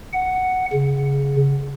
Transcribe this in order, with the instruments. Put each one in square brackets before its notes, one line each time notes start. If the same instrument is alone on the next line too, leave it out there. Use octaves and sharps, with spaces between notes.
[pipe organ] F#5
C#3